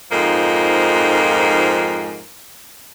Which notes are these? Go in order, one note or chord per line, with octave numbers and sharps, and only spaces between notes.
F2 G#2 F3 A#3 D#4